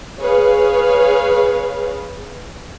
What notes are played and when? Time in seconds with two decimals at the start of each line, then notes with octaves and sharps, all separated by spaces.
0.20 G#4 B4 C#5 F5